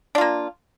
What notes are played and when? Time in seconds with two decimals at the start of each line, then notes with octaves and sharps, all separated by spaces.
0.15 D4
0.18 F4
0.21 A#3